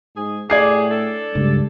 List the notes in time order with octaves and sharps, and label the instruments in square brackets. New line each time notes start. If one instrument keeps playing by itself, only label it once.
[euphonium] G#2 [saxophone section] G#4
[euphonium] A2 [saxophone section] G4 G#4 [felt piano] D5 G#6 C7
[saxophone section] D4 A4
[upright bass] C#2 G2 [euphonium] G3